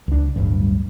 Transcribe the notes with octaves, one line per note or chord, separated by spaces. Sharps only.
C#2 D4
D1 G1 G2